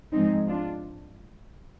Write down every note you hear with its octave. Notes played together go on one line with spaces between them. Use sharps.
G#2 F3 G#3 C4 D#4
D4 F4